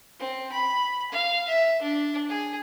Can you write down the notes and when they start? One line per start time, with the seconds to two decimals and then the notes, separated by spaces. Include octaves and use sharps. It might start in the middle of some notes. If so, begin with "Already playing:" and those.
0.19 C4
0.52 B5
1.11 F5
1.48 E5
1.82 D4
2.28 G#4